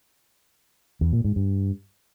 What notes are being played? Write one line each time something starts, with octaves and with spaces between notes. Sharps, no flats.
E2
A#2
G#2
G2